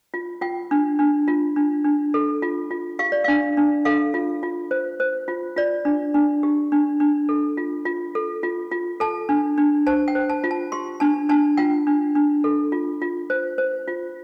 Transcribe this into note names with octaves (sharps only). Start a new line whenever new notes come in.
F4
F4 G5
D4
D4
F4
D4
D4
A4
F4
F4
G4 F5
D5
D4 F5
D4
A4 F5
F4
F4
C5
C5
F4
F4 D5
D4
D4
G4
D4
D4
A4
F4
F4
A4
F4
F4
A4 A5
D4
D4
C5 A5
G5
C5
A5
F4
A5
G4 C6
D4 A5
D4 A5
F4 G5
D4
D4
A4
F4
F4
C5
C5
F4